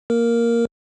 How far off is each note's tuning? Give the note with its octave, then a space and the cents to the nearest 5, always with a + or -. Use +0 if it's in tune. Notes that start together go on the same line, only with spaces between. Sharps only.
A#3 +0 A#4 +0